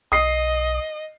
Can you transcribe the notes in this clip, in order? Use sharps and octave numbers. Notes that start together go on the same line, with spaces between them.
B1 D#5 D#6 C7